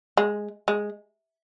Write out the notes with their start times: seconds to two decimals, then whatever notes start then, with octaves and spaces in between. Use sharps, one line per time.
0.17 G#3
0.68 G#3